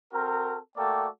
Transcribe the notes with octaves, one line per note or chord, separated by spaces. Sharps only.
C4 F#4 A4 A#4
A3 A#3 F#4 A4 D5 G5